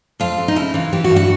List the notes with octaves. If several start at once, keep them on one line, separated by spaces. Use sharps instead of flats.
F2 F4
F2
D#4
C#3 E4
E3 F4
E3 G4
F#4
G2
F#4